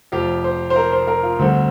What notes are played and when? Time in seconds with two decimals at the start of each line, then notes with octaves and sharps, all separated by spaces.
0.12 F1 F2 F3 G4
0.44 C5
0.70 C5
0.76 A#4
0.92 C5
1.07 A#4
1.23 F4
1.39 D2 D3 G3 C4